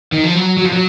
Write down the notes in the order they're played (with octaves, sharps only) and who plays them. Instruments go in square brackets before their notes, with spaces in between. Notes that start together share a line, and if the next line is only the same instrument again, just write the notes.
[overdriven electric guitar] D#3
F3
F#3
F#3
F3
F#3